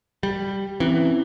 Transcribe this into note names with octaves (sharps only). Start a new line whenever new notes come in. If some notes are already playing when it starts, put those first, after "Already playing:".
G3
E3 C4 C#4 E4